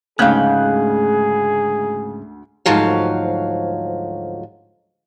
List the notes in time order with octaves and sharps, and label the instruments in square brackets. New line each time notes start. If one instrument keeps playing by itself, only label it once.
[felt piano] D2 F#6 [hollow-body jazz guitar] G#2 C#3 [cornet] G#4 [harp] F5 G5 G#6
[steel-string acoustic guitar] D2 G#2 F3 F#3 F5